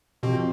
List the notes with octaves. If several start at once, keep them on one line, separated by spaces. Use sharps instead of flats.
B2 F3 C4 G4 C5